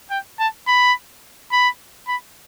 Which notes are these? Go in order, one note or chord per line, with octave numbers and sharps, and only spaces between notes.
G5
A5
B5
B5
B5